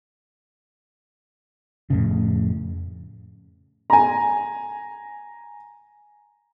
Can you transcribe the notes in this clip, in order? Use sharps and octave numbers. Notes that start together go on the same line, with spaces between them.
F2 A2 C#3
G#5 A#5